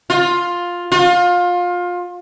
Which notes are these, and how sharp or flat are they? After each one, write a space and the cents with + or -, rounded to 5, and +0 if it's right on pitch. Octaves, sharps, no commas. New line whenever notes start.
F4 +10
F4 +25